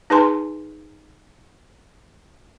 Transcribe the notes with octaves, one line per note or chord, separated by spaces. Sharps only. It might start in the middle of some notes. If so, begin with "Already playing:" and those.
D#4 G#4 B4 G#5 A5 C6